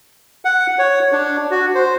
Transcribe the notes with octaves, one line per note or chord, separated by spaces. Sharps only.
F#5
C#5
D4
F#4
C5